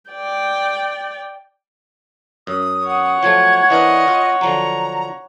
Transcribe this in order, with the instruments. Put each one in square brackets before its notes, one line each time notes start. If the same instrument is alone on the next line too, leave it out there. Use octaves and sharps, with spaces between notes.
[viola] D5 G5
[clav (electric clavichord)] F#2 [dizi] D#6
[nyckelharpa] C#5 F#5
[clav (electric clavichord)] F3 F#3 A3 [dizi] G#6
[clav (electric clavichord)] E3 D4 A#4 [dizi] D#5
[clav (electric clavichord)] F4
[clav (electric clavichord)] D3 F3 F#3 [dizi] A#5